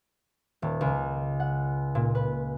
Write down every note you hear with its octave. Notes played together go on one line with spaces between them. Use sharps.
D#1
C#2
F#5
A#2
B4